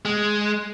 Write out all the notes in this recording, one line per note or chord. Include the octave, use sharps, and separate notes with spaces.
G#3